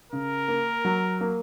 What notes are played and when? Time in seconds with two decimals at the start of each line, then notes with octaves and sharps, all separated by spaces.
0.12 C#3 A#4
0.48 A#3
0.85 F#3
1.21 A#3